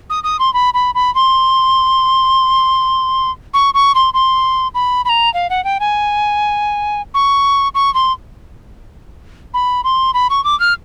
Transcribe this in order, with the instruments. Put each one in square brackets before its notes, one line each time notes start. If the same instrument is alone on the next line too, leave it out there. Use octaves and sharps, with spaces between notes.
[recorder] D#6
D#6
C6
B5
B5
B5
C6
C#6
C#6
C6
C6
B5
B5
A#5
F5
F#5
G5
G#5
C#6
C#6
C6
B5
C6
B5
C#6
D6
F6